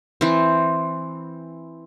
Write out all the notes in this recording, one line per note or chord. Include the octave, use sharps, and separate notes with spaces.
E3 C4